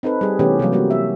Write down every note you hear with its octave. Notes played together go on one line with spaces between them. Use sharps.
C4 D#4 A4 B4
G3 G#4
C3 E3 A3 B3 C#4 G4
C3 E3 F#3 A#3
G3 A#3 F#4
E5